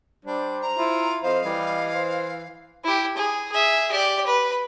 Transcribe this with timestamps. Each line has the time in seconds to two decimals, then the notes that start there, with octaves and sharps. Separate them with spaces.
0.25 G3 D4 C5
0.62 A#5
0.78 E4 F4
1.23 F2 C5 D#5 F5
1.45 E3 G3
1.94 C5
2.84 E4 G4
3.16 G#4
3.52 G#4 E5
3.91 G4 D5
4.26 B4